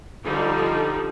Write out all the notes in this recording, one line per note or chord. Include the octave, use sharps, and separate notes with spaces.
D3 F3 G3 D#4